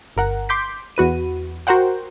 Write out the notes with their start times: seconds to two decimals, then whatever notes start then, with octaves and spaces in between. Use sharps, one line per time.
0.16 G1 A#4 F#5
0.49 C6 D6 G6 B6
0.97 E2 F#4 B4 D#7
1.67 F#4 A#4 C5 F#5 G5